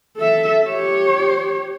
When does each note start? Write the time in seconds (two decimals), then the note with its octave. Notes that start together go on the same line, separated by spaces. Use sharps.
0.17 A4 E5
0.68 G4 C#5